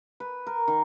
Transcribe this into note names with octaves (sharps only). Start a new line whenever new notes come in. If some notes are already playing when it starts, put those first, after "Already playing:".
B4
A#4
D#3